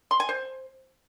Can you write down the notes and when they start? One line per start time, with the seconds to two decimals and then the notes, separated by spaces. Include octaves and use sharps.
0.11 C6
0.20 G#5
0.29 C5